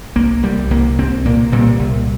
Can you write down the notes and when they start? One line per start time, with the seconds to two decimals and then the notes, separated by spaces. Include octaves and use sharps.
0.16 C2 A#3
0.43 C2 G3
0.70 C2 A#3
0.98 C2 C4
1.26 A#2 A#3
1.52 A#2 G3
1.79 C2